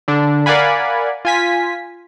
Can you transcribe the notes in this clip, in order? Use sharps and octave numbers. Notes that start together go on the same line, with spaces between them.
D3 D4
A#4 D5 F5 F#5 G#5 B5
F4 G#5 B6